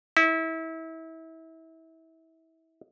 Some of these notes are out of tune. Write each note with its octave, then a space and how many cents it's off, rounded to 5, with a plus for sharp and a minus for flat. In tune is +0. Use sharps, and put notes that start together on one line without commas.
E4 -30